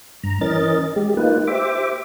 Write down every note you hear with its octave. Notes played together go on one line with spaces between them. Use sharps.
G2 A#5
E3 C#4 A#4 D#5 A6
G#3 G4
A#3 D#4 F4 B4
G4 C5 E5 D6